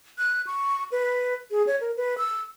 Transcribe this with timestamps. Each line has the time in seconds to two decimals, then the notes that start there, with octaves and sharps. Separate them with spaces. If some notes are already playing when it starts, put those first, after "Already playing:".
0.18 F#6
0.47 C#6
0.92 B4
1.51 G#4
1.67 C#5
1.81 A#4
1.97 B4
2.18 E6